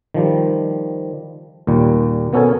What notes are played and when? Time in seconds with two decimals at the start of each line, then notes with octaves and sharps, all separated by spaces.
0.14 D#3 F3 G3
1.67 D#2 A#2 G3
2.33 B2 B3 C#4 A4 A#4 G#5